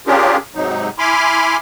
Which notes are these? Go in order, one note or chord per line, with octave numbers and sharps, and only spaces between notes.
C#4 D4 F4 G4 G#4 A#4
G#2 C3 F#3 D#4
E4 G#5 B5 C6 D6 F6